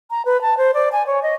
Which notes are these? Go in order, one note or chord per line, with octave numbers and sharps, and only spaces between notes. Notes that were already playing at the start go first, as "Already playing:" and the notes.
A#5
B4
A5
C5
D5
G#5
C#5
D#5